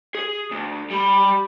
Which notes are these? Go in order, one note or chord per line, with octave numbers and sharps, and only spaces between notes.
G#4
D2
G3 B5